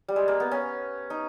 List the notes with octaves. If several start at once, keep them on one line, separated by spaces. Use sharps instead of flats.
G3
G#3
A#3
B3
C#4
D#4